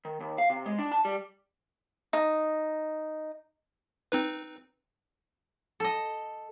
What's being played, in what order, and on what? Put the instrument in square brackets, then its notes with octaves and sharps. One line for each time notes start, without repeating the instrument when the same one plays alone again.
[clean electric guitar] D#3
D#2
F5
C3
G#3
D4
A5
G3
[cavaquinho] D#4
[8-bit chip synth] C4 D#4 B4
[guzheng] A4 D#5